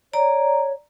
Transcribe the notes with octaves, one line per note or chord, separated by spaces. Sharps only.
C#5 D5 A#5